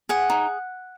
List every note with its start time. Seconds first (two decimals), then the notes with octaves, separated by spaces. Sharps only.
0.09 G#4 F#5
0.30 D#4